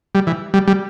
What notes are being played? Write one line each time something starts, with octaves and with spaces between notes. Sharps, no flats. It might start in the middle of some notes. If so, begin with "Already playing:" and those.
G3
E3
G3
G3